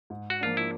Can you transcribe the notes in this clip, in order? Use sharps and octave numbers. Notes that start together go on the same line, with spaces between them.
G#2
F#4
F3 A#3 D4 F4
E4